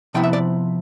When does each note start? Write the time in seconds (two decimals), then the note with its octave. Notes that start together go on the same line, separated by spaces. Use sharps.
0.14 C3 F3 B3 E4 G5
0.24 E5
0.33 D5